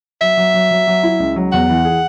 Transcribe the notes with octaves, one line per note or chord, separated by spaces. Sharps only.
F#3 E5
F#3
F#3
F#3
F#3
E4
C#2
F#3
E2 F#5
E3
G#4